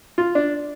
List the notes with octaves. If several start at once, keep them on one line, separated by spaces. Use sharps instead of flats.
F4
D4